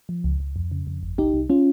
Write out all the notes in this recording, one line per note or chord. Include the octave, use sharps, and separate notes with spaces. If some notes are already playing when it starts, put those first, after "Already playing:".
F3
C#2
C#2
F2
C#3
F2
G1
C2 D#4 G4
C2
C#4 F4